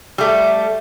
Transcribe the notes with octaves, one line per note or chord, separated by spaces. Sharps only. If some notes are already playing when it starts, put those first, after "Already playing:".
G3 A3